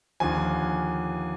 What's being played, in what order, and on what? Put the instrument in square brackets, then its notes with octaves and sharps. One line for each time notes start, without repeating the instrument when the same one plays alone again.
[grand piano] D#2 D3 F3 G#5